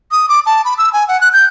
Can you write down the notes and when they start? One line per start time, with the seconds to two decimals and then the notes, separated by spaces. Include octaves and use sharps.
0.12 D#6
0.29 D6
0.46 A5
0.65 B5
0.78 E6
0.93 G#5
1.08 F#5
1.21 F#6
1.33 G6